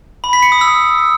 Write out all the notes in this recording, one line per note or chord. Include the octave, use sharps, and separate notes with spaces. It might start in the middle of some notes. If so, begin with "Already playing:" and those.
B5
B6
C#7
D#6
E6